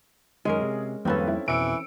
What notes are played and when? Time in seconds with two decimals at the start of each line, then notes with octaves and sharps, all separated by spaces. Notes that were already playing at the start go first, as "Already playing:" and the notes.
0.45 F#2 D#3 G#3 C#4 G#4 A#4
0.61 C3
1.05 G#1 F2 G3 A#3 C4 C#4 A4 B4
1.27 E4
1.48 F2 B2 E3 E6 C#7 D7